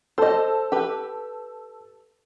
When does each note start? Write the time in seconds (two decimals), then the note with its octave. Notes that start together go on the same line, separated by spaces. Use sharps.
0.18 A4 C5 D#5
0.72 G4 B4